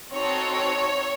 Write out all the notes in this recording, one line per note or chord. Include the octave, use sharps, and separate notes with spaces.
C4 D#4 F#4 A4 C#5
C#5